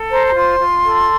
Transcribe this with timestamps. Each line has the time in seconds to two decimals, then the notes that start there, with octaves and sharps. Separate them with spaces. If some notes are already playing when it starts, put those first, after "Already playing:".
Already playing: A4
0.12 C5 A#5
0.27 A#5
0.35 F4 C6
0.59 F4
0.82 A4